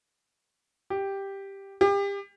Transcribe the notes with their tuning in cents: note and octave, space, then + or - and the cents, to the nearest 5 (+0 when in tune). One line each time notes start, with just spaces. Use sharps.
G4 +0
G4 +30